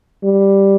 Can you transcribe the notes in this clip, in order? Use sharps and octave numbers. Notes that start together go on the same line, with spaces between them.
G3